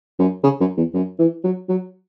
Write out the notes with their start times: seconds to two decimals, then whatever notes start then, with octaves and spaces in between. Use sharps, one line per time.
0.19 F#2
0.43 C#3
0.60 F#2
0.77 E2
0.94 F#2
1.19 E3
1.44 F#3
1.69 F#3